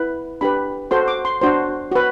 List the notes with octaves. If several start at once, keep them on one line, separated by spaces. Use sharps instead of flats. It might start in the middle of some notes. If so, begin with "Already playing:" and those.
Already playing: E4 B4
D4 G4 B4 B5
F#4 A4 C5 C6
D6
C6
D4 F#4 C5 C6
F#4 B4